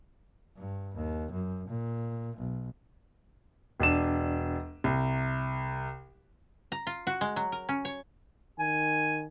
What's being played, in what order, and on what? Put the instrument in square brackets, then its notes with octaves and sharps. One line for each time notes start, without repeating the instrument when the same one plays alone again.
[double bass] G2
D#2
F#2
A#2
B1
[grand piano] E1 D4 E7
C2
[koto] A#5
F4
F#4
G#3
F#3
A#4
C#4
C#5
[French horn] D#3 [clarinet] G#5